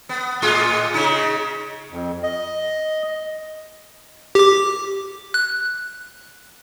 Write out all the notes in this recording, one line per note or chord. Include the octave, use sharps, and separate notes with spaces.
B3
A2 G#3 F4
C#3 D#4
F2
D#5
G4 D6
F#6